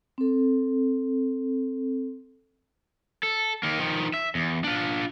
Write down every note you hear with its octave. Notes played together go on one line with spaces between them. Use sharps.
C4 A4
A4
D#3 A#3
D#3 F3
E5
E2
D4 F4